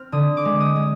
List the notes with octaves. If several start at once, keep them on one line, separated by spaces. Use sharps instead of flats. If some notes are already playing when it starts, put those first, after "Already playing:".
Already playing: C4 F6
D3 D#6
D6
G#3
D#6
G#3